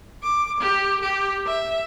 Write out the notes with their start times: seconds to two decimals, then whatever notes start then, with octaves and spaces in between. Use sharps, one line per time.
0.23 D6
0.61 G4
1.01 G4
1.47 E5